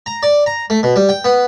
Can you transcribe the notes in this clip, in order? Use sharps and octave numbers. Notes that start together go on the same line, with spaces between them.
A#5
D5
A#5
A3
B2
G3
G5
B3